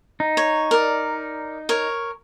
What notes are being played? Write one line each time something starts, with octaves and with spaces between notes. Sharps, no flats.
D#4
C#5
A#4 D5
A#4 C#5